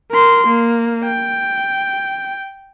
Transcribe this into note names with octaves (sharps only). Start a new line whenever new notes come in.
A#4 C6
A#3
G5